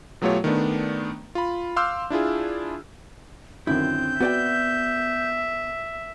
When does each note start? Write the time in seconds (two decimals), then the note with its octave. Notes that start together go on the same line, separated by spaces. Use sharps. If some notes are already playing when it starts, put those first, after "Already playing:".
0.21 B2 F#3 A3 F4 G4 C#5
0.44 D#3 A3 B3 D4
1.35 F4 B5
1.76 F5 C6 D6 E6 F6 G6
2.10 D4 E4 F4 G#4
3.67 F#2 D3 D#3 C4 E4 G6
4.20 B3 F#4 D5 E5 G5